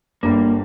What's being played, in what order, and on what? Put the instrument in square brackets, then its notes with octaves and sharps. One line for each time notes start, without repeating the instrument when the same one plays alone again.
[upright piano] G1 G2 D3 G3 [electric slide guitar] A#3